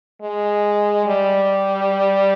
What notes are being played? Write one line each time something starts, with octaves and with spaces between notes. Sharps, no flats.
G#3
G3